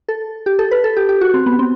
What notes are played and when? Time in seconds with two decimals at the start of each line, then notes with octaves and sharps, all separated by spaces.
0.09 A4
0.46 G4
0.59 A4
0.71 B4
0.84 A4
0.97 G4
1.09 G4
1.21 F#4
1.34 C4
1.46 B3
1.59 C4